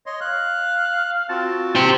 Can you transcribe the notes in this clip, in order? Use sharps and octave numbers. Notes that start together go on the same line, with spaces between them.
C#5 D#5 C6
F5 F#6
C4 F4 F#4 A5
G4 C5